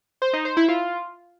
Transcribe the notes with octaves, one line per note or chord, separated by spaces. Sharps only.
C5
D#4
C5
E4
F4